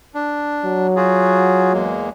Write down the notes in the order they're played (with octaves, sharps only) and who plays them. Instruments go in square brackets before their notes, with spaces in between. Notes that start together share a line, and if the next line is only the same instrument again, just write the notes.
[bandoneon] D4
[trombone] F#3
[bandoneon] F4 F#4 G#4
E2 G#3 A#3